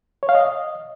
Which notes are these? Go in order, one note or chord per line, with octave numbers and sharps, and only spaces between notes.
C#5
F5
D#5